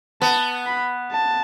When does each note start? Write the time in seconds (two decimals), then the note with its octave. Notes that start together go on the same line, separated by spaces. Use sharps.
0.22 B3 A5
0.66 B5
1.13 A5